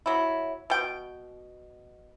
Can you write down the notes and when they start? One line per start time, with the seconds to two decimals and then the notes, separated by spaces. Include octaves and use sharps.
0.06 F#3 E4
0.70 B2 G5